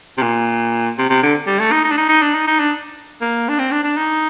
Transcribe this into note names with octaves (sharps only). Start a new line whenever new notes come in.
C3
A#2
C3
C3
D3
G3
A3
D#4
D#4
D4
D#4
D#4
D4
D#4
D#4
D4
A#3
D4
C4
D4
D4
D#4